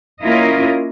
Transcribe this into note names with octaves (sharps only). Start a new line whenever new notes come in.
A#3 C#4 E4 F4 A#4 D#5